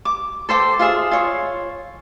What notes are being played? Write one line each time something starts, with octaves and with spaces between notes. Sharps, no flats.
D6
A4 C5 G5 D6
F4 G#4 E5 D#6
F4 C#5